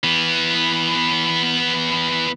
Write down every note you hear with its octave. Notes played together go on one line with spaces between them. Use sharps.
E3 B3